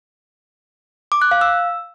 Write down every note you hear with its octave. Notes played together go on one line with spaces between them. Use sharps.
D6
F#6
F5
E6